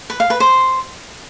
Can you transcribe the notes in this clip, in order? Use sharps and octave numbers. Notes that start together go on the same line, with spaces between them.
B4
F5
B4
C5